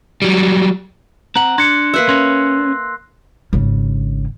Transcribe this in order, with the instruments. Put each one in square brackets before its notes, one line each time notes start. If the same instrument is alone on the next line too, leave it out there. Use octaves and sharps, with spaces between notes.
[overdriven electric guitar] F#3 G3
[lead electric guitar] C4 F#5 [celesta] A#5 [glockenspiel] F#6
[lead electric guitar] D4 [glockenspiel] C6 F#6 A#6 [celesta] G#6 C#7
[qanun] A#3 B4 E5 [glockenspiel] E6 F#6 C7
[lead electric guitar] C#4 [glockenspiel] C6 A#6
[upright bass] G#1 C#3